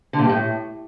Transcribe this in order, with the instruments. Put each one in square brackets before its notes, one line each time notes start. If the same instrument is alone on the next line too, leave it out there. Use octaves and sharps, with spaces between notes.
[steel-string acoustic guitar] D3
A#2
G2
A2